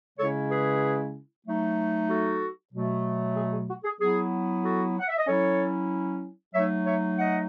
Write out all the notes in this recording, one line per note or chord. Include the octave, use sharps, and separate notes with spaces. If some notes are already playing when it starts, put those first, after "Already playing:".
C#3 G#3 C#4 E4 A4 C#5
G#4 B4
F#3 A3 D#4
F#4 A4
B2 F#3 A3
G#4
G#4
F#4
G#4
F#3 B3 E4 G#4
F#4 A4
F#5
E5
D#5
F#3 C#4 E4 A4 C#5
F#3 A3 D#4 C#5 E5
C#5 E5
D#5 F#5